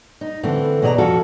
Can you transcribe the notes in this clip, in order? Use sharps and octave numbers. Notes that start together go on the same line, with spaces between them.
D#4
D3 E3 A3 C4
B2 G#4 D5 D#5 A#5
F2 F4 F#4 A4